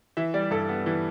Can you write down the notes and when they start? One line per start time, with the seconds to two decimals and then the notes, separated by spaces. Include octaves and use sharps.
0.17 E3 E5
0.34 G3 D5
0.51 G2 A4
0.69 B3
0.86 E3